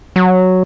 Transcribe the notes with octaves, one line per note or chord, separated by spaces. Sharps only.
F#3